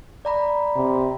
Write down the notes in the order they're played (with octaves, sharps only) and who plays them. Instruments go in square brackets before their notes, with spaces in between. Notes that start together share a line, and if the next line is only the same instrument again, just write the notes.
[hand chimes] D5 A#5 B5
[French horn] C3